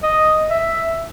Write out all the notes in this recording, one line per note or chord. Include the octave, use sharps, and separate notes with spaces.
D#5
E5